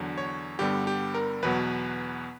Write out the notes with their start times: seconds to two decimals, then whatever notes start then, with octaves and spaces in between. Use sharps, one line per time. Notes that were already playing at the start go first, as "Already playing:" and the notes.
Already playing: E2 D3 F#3
0.18 C#5
0.59 G2 D3 G3 B3 G4
0.87 G4
1.14 A#4
1.42 E2 B2 F#3 B3 B4